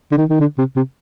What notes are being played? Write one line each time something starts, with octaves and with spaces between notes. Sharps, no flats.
D3
D#3
D#3
D3
C3
C3